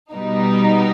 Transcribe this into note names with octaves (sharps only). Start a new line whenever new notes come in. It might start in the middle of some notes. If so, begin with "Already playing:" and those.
B2 G3 B3 D#4